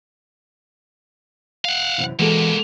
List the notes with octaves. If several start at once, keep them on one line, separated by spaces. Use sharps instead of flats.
F5 F#5
F#2 C3 E3
B2 E3 G#3 A#3 F#4 A4